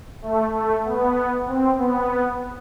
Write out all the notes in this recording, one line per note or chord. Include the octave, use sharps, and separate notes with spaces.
A3
A3
B3
C4
B3